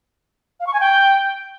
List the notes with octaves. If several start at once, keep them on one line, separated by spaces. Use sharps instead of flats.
F5
C#6
G#5
G5